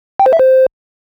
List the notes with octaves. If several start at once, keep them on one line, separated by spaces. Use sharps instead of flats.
G5
C5
E5
C5